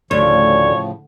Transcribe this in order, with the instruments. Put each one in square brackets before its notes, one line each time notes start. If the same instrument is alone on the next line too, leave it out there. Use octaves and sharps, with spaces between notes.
[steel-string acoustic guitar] D2 [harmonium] A2 C#3 F3 [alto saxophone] C#5 [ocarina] D5